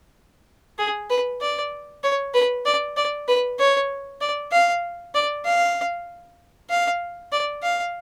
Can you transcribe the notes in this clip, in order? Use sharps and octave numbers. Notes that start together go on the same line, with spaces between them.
G#4
B4
D5
C#5
B4
D5
D5
B4
C#5
D5
F5
D5
F5
F5
D5
F5